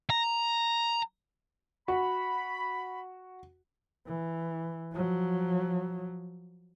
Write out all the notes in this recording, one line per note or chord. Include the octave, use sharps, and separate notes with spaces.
A#5
F#4 B5
E3
F3 F#3